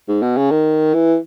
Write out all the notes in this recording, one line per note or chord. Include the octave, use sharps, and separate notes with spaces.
G#2
B2
C#3
D#3
E3